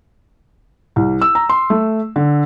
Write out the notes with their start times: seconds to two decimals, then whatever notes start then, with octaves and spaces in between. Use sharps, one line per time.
0.96 C2
1.22 E6
1.35 A#5
1.49 C6
1.70 A3
2.16 D3